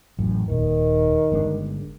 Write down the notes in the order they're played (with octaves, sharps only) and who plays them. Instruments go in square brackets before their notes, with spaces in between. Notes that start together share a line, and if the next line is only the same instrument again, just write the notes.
[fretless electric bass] A1 F#2
[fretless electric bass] D#1 [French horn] D#3
[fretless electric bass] G1 G#3 D4